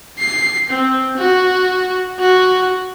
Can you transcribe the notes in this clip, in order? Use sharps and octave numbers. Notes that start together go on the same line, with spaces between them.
C7
C4
F#4
F#4